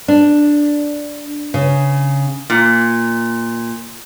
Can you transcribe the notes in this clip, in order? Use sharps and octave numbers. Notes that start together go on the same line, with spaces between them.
D4
C#3
A#2